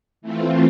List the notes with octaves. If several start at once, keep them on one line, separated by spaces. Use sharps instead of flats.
E3 A3 C4 F4